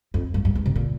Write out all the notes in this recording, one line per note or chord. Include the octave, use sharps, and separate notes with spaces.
F2
G2
G2
G#2
C3
A#2